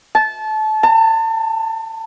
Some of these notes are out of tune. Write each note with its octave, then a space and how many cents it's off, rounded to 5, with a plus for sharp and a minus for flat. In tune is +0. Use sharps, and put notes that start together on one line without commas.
A5 -25
A5 +35